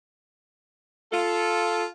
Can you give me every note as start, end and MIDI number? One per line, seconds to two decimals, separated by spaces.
1.13 1.86 65
1.13 1.86 69